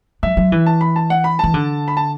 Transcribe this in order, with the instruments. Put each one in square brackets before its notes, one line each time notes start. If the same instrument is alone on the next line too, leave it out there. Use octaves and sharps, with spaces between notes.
[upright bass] F#3 [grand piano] E5
[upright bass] F#3
E3
[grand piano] A5
B5
A5
F#5
B5
[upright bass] E3 [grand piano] A5
[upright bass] D3
[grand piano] B5
A5